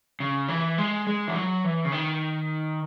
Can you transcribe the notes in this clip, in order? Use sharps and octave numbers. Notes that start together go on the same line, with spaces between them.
C#3
E3
G#3
G#3
E3
F#3
E3
C#3
D#3